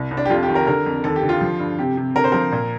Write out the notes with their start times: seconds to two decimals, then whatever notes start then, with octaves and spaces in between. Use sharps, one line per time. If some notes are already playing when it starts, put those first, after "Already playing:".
Already playing: C2
0.11 C2
0.17 D4
0.26 G4
0.29 F2 F4
0.43 G4
0.48 D#3
0.55 A#4
0.67 D3 A#4
0.86 F2
1.04 D#2 A4
1.16 G4
1.23 D3
1.29 F4
1.41 F3
1.59 G2
1.79 C3 G4
1.97 C3
2.15 D3 A#4
2.24 C5
2.32 F3 A#4
2.52 A#2